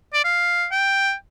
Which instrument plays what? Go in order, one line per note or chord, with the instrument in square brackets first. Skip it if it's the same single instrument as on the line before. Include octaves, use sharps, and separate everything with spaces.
[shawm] D5
F5
G5